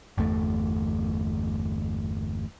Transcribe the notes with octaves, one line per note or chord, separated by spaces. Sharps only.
G1 E2 A3